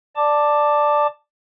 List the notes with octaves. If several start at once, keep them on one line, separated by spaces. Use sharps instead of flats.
D5 A5 D6